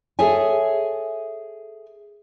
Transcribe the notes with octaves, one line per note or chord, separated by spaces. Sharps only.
G#4 A4 C#5 E5 G#5